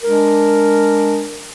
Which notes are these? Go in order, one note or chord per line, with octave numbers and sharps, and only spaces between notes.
G#3 D4 A#4